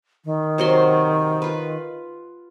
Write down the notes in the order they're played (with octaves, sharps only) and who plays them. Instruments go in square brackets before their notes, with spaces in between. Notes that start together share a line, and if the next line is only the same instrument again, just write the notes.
[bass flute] D#3
[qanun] C3 F#3 C6
F4 B4